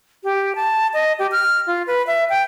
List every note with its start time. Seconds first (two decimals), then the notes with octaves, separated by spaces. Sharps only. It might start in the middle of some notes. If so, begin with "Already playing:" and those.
0.24 G4
0.55 A5
0.94 D#5
1.19 G4
1.32 F6
1.67 F4
1.87 B4
2.07 E5
2.30 G5